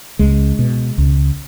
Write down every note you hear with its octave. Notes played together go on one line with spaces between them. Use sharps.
C#2 G#3
B2
C#2